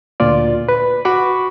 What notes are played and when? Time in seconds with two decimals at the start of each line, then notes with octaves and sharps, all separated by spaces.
0.20 D2 A#2 F4 D5
0.69 B4
1.05 F#4 B5 C#6 D6